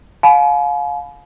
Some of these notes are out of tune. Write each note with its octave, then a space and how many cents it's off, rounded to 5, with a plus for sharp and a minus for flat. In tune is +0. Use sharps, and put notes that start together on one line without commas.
F5 +30 G#5 +45 B5 +5